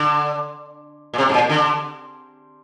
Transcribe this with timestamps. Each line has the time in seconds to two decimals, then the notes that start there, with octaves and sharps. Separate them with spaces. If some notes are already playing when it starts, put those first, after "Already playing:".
Already playing: D3
1.14 A#2
1.18 C3
1.29 G#2
1.34 A#2
1.49 D3